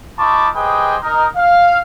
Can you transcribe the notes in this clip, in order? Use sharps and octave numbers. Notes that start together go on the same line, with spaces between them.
D#4 F4 A5 B5 C#6 D6
G4 G#4 B4 C5 D#5 G5
D#4 A#4
F5